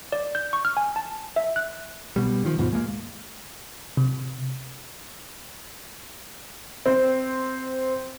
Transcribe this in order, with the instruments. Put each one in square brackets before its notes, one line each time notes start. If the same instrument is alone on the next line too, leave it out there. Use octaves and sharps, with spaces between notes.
[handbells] D5
G6
C#6
F6
G#5
A5
E5
F#6
[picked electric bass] B2 G3
D#3 F3
D#2 G#2 B2 F3
G#3 A#3
[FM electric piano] C3
[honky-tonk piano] C4